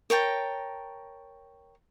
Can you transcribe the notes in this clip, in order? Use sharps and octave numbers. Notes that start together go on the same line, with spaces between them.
A#4 C#5 G5 A5